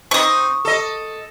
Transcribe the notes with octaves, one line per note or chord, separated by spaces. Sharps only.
C4 D#4 C#6 D#6
A4 D#5